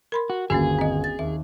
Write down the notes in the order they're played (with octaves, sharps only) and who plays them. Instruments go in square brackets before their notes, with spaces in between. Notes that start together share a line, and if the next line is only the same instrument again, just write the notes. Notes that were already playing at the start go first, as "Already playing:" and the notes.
[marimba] A#4 B5 C6
[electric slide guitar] F#4
[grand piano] G1 D#2 [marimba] A#3 C#4 F#4 [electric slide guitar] G#4
[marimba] C4 D#5
A6
[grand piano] D#2 D#3 [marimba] E5